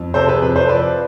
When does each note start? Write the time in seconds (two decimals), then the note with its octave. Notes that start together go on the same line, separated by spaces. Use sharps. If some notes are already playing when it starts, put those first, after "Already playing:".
Already playing: F2
0.14 C3 A4 C5
0.28 G#4 B4
0.41 F2 G#4 B4
0.56 A4 C5
0.68 F3 B4 D5